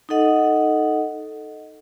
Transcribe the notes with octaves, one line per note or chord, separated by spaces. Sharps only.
D#4 A4 D#5 F#5